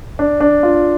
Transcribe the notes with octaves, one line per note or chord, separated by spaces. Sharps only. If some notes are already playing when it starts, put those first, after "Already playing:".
D4
D4
F4